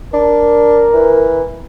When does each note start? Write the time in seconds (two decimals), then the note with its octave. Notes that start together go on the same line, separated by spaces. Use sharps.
0.14 D4 A#4
0.94 E3